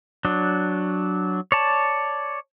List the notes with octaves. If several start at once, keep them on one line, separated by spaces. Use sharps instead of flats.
F#3 D4
C#5 D5 A5